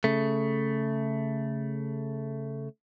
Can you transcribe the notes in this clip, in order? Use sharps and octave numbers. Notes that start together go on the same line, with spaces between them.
C#3 A3